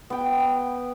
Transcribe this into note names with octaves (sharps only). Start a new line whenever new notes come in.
B3 G5